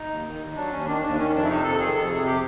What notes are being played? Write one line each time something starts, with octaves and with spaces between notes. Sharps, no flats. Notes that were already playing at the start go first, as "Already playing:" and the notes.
Already playing: D#4
D#2
D#3
D#2
F#3 D4
D#2 C#4
D#3 D4
D#2 D4
D#3 C#4
F2 D4
E4
C3 D#4
F2 A4
D#3 G#4
F2 A4
C3 G#4
G4